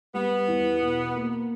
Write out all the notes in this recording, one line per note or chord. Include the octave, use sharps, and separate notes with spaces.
G3 B3
E2
B2
A#3